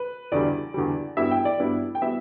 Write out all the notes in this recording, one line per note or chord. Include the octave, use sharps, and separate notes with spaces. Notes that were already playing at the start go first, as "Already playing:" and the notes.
Already playing: B4
E2 D3 G3 D5
E2 D3 G3
G2 G3 B3 E4 E5
G5
D5
G2 G3 B3 E4
G5
G3 B3 E4 E5